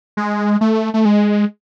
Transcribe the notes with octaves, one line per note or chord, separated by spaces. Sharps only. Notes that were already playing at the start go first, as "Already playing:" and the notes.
G#3
A3
A3
G#3